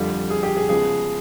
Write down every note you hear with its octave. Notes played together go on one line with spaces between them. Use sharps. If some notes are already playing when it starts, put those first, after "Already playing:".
Already playing: F2 D3 G3 F4
G#4
G4
G#4
C#3 F3 G#3 B3 G#4